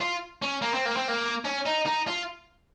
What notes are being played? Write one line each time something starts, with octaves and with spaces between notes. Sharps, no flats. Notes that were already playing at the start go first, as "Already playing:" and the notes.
F4
C#4
A#3
C4
A#3
C4
A#3
C#4
D#4
D#4
F4